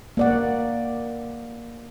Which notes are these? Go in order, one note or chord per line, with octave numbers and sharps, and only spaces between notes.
A#3 D5 F#5